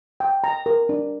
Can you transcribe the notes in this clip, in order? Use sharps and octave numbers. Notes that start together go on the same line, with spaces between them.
G5
A#5
A#4
D4